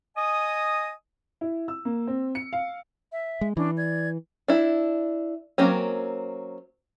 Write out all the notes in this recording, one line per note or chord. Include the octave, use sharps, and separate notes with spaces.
D#5 G#5 D#6
E4
E6
A#3
C4
C#7
F5
E5
G#3
E3 C#4 D4
D5 G#6
D4 E4
F#3 A#3 C4 C#4